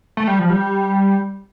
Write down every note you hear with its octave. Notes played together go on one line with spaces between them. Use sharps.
A3
G3
F3
G3